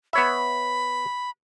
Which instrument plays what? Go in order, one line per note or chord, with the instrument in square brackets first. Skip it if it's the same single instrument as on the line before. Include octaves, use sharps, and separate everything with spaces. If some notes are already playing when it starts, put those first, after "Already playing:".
[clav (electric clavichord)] B3 C#5 E5 [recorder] B5